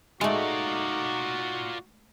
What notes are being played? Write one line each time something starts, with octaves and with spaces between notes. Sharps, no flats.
G#3 A3 D#4 F4 F#4 D5